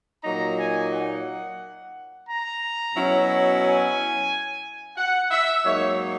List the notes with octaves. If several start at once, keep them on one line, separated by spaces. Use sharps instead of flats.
A#2 F#3 A#3 D#4 A#5
G#5
F#5
A#5
B2 F#3 C#4 E4
G#5
F#5
E5
G#2 F#3 A#3 D#4 C#5